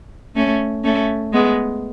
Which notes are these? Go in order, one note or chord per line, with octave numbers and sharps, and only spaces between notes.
A3 C#4
A3 C#4
G#3 B3